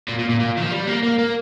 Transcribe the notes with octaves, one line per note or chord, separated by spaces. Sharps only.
A#2
A#2
A#2
A#2
D#3
F3
G3
A#3
A#3
A#3